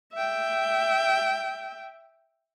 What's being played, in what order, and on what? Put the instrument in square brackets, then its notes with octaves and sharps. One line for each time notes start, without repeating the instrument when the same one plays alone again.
[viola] E5 G5